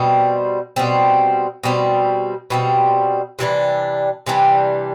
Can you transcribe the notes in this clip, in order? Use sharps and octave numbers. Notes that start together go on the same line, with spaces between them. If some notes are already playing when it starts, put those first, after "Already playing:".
Already playing: B2 G3 C4
B2 G3 C4
B2 G3 C4
B2 G3 C4
C3 E3 G3 D4
C3 E3 G3 D4